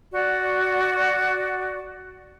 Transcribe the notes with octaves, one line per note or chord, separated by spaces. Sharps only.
F#4 D5